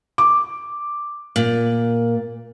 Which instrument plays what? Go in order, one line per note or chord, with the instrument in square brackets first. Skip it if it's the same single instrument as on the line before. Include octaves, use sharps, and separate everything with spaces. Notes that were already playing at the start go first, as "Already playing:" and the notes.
[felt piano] D6
[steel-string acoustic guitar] A#2